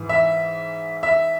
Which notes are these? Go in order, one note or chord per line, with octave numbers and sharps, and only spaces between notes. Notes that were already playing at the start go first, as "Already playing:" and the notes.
Already playing: G#2 E3
E5
E5